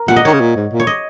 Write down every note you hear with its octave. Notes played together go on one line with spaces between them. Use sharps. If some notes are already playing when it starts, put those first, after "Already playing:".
Already playing: A#4
A#2 F#5
D#5
D#3 C#5
C#3
A#2
G#2
A#2
C#5
D#5